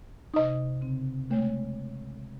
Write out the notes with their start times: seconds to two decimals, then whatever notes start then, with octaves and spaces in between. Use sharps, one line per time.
0.34 C3 D#4 D#5 D#6
0.82 C#3 C4
1.30 G#3 A3 C#5 G5